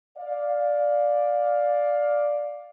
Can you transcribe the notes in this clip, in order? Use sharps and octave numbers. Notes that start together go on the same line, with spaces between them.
D5 F5